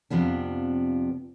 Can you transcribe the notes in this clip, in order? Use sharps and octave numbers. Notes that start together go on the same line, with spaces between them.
F2 C3 F3 B3 D4